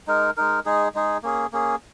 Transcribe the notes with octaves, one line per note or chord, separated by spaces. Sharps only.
G#3 D#4 A#4
G#3 D#4 A#4
G#3 D#4 G#4
G#3 D#4 G#4
A#3 C#4 G#4
A#3 C#4 G#4